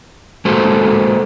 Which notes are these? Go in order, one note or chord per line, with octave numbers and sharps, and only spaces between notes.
G#3 A#3 F#4 A4 C5